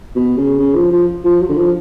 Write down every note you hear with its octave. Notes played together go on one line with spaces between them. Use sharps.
B2
C#3
C#3
F3
F3
F3
F#3
D3
F3